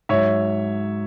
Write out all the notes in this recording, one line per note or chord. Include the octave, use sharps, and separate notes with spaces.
G#2 F#3 C#5 E5